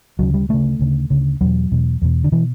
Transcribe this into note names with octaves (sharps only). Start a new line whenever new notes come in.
D2 C#3 F#3
G3
D2 C#3 A3
D2 C#3
D2 C#3
E2 B2 F#3
E2 B2
E2 B2
D3
B2 E3